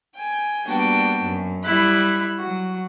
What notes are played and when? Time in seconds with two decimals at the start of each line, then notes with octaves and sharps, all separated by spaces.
0.14 G5 G#5
0.65 G3 A#3 B3 D4 F#4 G5
1.22 F#2
1.64 G3 E4 B5 F#6
2.41 F#3 F#4